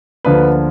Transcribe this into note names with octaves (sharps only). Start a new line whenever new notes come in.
D2 D3 F3 A#3 B4